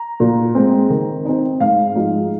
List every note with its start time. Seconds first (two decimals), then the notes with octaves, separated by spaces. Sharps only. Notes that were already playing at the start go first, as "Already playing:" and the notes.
Already playing: A#5
0.20 A#2
0.55 G#3 C4
0.90 D#3
1.25 C4 D#4
1.60 G#2 F5
1.95 F3 G#3 D#4